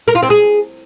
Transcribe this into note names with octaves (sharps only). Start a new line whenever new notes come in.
A#4
F4
C4
G#4